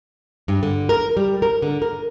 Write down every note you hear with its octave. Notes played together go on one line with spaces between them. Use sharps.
G2
D3
A#4
G3
A#4
D3
A#4